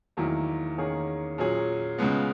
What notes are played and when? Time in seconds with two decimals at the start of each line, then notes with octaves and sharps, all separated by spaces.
0.17 E2 D#3 F#3 A#3 E4
0.78 E2 D#3 A#3 C#4 G#4
1.38 A#2 F#3 C#4 G#4
1.98 C#2 C#3 G#3 B3